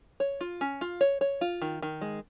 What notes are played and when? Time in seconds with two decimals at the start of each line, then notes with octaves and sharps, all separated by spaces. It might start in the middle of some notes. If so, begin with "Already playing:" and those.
0.20 C#5
0.41 F4
0.61 C#4
0.81 F4
1.01 C#5
1.21 C#5
1.41 F4
1.62 D#3
1.82 D#3
2.01 G#3